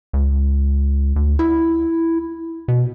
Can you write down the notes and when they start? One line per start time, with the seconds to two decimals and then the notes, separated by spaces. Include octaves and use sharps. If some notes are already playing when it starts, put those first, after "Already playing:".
0.13 C#2
1.16 D2
1.39 E4
2.68 B2